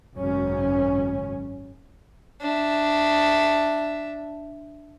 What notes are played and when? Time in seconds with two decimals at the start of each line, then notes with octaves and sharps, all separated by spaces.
0.17 G#1 F#2 C#3 C#4
2.41 D4 E5